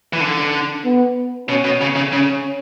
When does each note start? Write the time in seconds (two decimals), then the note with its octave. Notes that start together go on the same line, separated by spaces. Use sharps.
0.13 E3
0.20 D3
0.85 B3
1.48 B2 C#4
1.64 B2
1.81 C#3
1.96 C#3
2.12 C#3 C#4